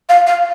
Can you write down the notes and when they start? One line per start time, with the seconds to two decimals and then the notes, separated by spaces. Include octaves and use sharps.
0.09 F5
0.27 F5